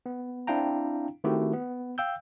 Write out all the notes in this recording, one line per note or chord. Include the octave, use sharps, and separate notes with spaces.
B3
C4 D4 E4 F5 G5 A#5
D#3 A3 C4 E4 F#4 G4
B3
F5 G5 E6 G6